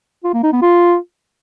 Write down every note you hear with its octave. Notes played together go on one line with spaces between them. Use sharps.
F4
A#3
D#4
B3
F4